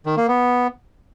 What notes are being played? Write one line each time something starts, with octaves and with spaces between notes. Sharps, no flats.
D#3
A#3
B3